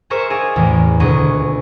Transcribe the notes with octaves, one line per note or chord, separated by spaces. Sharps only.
G#4 A#4 C5 E5 C#6 F6
G#4 D5 D#5 F5 G#5
A1 E2
D#1 D2 B2 G#4 D#5 C#6